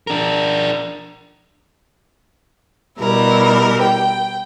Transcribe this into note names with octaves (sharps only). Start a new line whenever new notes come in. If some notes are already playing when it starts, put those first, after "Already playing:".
D4 A#4
B2 G3 E4 A#4
G5